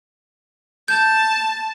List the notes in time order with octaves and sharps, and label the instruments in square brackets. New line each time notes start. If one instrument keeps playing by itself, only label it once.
[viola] A5 [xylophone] G6